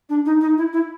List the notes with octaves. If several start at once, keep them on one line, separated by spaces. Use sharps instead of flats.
D4
D#4
D#4
E4
E4